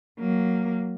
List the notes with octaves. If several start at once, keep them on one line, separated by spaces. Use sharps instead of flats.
F#3 A#3